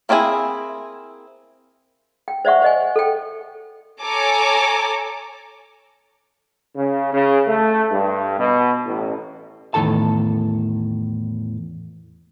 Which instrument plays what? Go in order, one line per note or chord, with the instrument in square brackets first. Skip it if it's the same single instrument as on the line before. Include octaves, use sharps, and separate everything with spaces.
[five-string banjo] A#3 C4 D4 E4 G#4
[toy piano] G5
C5 D5 E5 F#5 C#6
C5 D#5 G#5
A4 G5
[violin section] A4 C#5 G#5 A#5 D6
[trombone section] C#3
C#3
A3
G2
B2
A1
[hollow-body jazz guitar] E2 A2 D#3 A4 A5